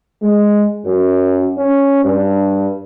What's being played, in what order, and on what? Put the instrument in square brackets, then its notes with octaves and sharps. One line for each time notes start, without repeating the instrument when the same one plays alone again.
[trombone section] G#3
F#2
C#4
G2